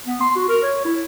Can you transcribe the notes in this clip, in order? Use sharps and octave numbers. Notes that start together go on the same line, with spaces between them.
B3
C6
F#4
A#4
C#5
E4